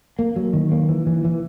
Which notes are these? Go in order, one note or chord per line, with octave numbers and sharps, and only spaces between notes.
A#3
F#3
D#3
A#3
E3
E3
E3